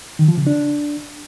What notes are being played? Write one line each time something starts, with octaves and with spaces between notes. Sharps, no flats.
D#3
F3
C#3
D4